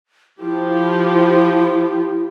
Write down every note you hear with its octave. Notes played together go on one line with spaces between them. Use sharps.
F3 E4 G4